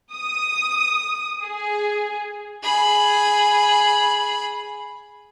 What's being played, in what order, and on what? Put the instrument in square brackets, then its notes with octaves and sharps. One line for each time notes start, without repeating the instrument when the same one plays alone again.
[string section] D#6
G#4
[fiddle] G#4 B5